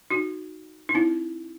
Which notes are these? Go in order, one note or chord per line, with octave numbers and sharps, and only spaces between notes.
D#4 F#4
D#4
C4 E4